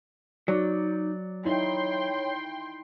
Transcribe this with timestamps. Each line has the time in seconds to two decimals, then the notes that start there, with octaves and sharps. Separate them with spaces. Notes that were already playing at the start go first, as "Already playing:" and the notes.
0.48 F#3 D#4 D5
1.45 D#4 E4 C#5 G5 C6